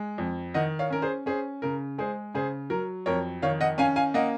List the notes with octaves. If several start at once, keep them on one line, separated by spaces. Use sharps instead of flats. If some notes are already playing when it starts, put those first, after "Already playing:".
Already playing: G#3
F2
D#3 D#5 F#5
C#5 F5
C#4 A#4
G#4 C5
C#4 G#4 C5
C#3 A#4
G#3 G#4 C5
C#3 G#4 C5
F#3 A#4
F2 A#4 C#5
D#3 C#5 F5
D#5 F#5
C#4 F5 G#5
F5 G#5
A#3 D#5 F#5